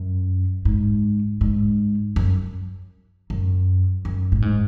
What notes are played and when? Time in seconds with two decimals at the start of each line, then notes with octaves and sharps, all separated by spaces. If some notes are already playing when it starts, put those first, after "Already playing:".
Already playing: F#2
0.65 G#2
1.41 G#2
2.16 F#2
3.30 F#2
4.05 F#2
4.32 A2
4.42 G#2